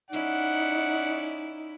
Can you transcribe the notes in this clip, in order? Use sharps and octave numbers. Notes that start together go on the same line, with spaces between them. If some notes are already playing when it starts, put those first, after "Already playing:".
C#4 D#4 E4 D5 F#5